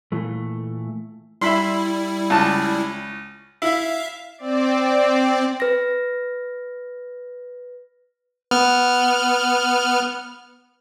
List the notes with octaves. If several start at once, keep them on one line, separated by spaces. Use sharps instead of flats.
A#2 E3 A3
G3 E4 E5 B5 C6
C#2 A5
E4 E5 F5
C4 D5
B4 A#6
B3 F6